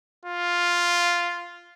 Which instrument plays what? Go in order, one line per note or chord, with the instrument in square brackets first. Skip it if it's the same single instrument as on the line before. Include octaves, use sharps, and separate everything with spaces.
[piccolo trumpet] F4